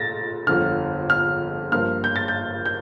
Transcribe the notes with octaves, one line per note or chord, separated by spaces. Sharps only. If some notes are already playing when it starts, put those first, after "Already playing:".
Already playing: A#2 A3 A6 A#6
G1 F2 D3 F6
F6
G2 F3 A#3 F4 F6
G6
A6
G6
G6